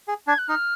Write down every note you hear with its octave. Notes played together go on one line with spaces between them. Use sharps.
G#4
D4 G#6
F#6
D#4 F6